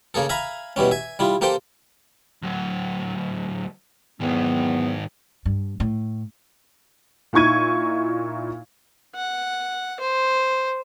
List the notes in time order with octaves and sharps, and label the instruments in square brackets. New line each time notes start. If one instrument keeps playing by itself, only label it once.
[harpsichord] C#3 A#3 G#4 A4
E5 F5 G#5 A#5 B5
B2 E3 G3 C#4
E5 G#5
G3 E4 F4
A#3 G4 A4 C5 G5
[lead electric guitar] D2 F#3
[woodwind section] E2 F#3 B3 [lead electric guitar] G#2 D#3
[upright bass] G2
A2
[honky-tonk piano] A#2 D#4 E4 C#6 G#6 D#7
[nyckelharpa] F#5
C5